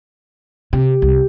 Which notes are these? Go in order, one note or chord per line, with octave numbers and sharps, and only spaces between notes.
C3 G4
C2